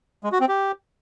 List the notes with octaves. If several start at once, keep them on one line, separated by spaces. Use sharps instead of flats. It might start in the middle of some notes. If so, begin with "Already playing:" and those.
G#3
F#4
C4
G4